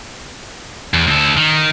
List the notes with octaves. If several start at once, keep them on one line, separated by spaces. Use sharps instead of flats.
E2
D2 A4
D#3